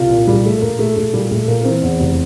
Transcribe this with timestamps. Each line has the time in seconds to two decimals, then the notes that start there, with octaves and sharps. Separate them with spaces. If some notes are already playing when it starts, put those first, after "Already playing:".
Already playing: C2 F4
0.10 A#2
0.27 A#1 G3
0.45 A#2 A3
0.62 A#1 A#3
0.79 A#2 A3
0.96 A#1 A3
1.13 A#2 G3
1.31 A#1 A3
1.48 A#2 A#3
1.61 A#3
1.65 E3 C4
1.83 E2
2.00 F1